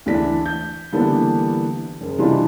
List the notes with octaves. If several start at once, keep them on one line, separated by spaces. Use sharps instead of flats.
D2 E3 D4 B6
G6
D3 E3 G3 A#3 B3 D4
F#1
C3 E3 G3 D4 D#4 F4